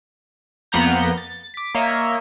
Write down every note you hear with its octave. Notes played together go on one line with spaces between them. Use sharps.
F2 A#3 B3 F#5 A#5 G6
A6
D6 B6
A#3 C#5 D#5 E5